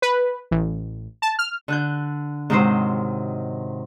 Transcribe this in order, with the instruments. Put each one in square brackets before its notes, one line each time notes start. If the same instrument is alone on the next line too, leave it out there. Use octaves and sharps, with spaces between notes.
[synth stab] B4
A1
A5
F6
[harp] D3 F#6 G6
G#2 C3 D#3 F#3 C5